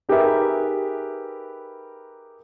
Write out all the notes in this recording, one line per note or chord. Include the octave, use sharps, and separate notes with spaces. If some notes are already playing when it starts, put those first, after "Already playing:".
D#4 G4 G#4 A#4 B4 E5